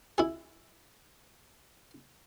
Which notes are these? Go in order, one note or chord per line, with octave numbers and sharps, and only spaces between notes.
E4 G#4